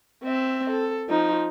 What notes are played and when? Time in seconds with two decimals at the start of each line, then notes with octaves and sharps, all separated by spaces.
0.23 C4 E5
0.70 A4
1.09 F3 D#4